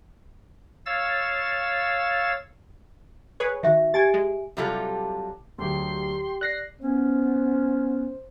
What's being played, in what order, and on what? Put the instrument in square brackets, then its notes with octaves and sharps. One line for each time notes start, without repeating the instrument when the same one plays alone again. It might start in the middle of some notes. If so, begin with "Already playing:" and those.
[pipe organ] C#5 F5 E6 A6
[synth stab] G#4 B4 C#5
[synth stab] D#3 F#4 [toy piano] E5
[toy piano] G4 G#5 [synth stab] G#6 A6
[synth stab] G#3
[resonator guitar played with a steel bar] C3 F#3 G3 F4 G4 A4
[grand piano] D2 F#3 G#4 [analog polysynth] G4 [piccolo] C6
[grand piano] D5 [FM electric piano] F#6 A#6 C7
[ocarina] B3 [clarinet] C#4 [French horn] C5